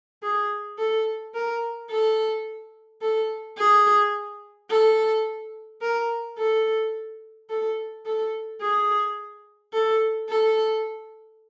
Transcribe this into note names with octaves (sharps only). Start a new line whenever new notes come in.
G#4
A4
A#4
A4
A4
G#4
A4
A#4
A4
A4
A4
G#4
A4
A4